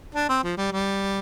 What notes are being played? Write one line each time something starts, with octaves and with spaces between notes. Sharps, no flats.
D4
C4
F3
G3
G3